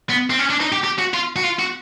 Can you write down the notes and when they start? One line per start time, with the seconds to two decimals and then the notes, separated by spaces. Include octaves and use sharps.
0.09 B3
0.30 C4
0.39 C#4
0.51 D4
0.61 D#4
0.72 G4
0.84 G4
0.99 F#4
1.14 F4
1.36 F#4
1.43 F4
1.59 F#4